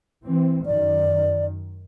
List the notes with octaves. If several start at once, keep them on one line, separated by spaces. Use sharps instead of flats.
E3 C4
F#2 D#3 D5